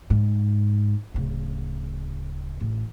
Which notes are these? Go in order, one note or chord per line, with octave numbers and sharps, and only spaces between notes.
G#2
D1 C#3
A1